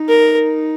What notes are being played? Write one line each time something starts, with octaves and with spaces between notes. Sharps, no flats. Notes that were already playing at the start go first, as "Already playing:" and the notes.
Already playing: D#4
A#4